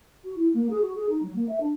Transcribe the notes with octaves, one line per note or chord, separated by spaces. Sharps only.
F#4
E4
A#3
G#4
F#4
G#4
D#4
F#3
A#3
E5
D4